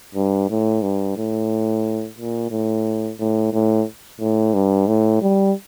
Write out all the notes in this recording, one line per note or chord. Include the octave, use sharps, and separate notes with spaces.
G2
A2
G2
A2
A#2
A2
A2
A2
A2
G2
A2
G3